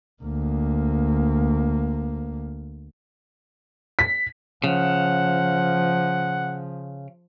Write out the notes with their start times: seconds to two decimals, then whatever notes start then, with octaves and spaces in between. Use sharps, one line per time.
0.23 D2 A#3
3.99 B6
4.64 C#3 F3 F#5